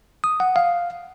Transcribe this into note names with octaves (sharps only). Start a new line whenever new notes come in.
D#6
F#5
F5